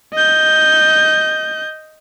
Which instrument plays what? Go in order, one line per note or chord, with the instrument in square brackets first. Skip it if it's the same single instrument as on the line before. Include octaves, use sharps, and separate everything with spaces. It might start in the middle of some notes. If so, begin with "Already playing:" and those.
[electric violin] D#5 G6